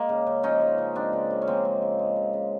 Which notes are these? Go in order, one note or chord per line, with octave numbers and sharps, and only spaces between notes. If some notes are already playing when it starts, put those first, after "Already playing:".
Already playing: G#3 A#3
C#3
C#3
F3 C#4 D#4
G#3
C#3
G#3 C4 D4
C#3
C#3
C#4
F3 A#3 C4
G#3
C#3
G#3
C#3
C#3